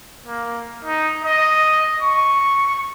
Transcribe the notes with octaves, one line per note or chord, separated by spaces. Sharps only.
A#3
D#4
D#5
C#6